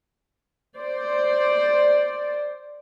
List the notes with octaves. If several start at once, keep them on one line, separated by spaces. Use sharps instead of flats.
C5 D5